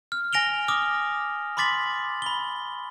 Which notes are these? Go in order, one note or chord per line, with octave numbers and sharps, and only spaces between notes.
F6
G#5 A#6 D7 F7 G7
D6 D#6 F6
B5 C6 D6 A6 B6 F#7
B5 G7